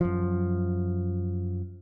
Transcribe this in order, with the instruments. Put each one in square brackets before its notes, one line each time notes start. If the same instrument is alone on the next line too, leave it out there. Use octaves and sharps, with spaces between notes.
[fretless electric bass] F#2 F3